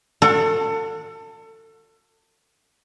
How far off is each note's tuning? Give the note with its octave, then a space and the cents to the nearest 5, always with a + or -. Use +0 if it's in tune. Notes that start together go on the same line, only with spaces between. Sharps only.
F#4 -35 A4 +30